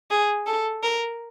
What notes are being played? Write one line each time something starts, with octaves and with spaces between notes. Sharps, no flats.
G#4
A4
A#4